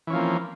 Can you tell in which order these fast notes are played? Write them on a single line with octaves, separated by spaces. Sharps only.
E3 C#4 F3 A#3 C4